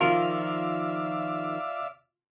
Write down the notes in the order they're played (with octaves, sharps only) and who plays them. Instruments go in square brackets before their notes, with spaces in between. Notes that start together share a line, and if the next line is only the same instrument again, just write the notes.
[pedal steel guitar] D#3 F3 A#4 [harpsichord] F4 [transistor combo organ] D5 E5 F5